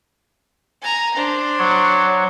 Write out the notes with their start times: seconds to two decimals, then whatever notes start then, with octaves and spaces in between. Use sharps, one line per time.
0.82 G#5 A#5
1.14 D4 C5
1.59 F#3 C#5